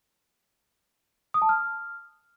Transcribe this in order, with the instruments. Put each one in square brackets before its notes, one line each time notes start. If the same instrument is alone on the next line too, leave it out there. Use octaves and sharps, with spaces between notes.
[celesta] D#6
A5
F6